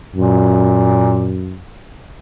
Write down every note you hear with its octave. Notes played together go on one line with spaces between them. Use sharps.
F#2 A#2